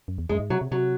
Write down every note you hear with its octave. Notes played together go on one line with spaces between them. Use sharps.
F#2
E2
E2 G#3
F#2
G#2
C3 F#3
C3
C3 F#3